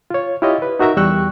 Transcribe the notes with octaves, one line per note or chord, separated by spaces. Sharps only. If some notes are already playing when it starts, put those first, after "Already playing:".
F4 C#5
E4 F4 G4 C#5 D#5
B4
D#4 F#4 A#4 E5 A#5
E2 G3 G5 C#6 E6 F#6